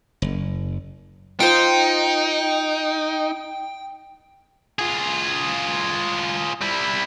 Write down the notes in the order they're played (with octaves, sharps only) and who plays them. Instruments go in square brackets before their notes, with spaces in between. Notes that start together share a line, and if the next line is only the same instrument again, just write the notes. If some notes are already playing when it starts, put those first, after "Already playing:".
[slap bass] F#1
[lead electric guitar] D#4 [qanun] F4 C5 [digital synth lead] G5
[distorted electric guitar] F4 G#4
G3 E4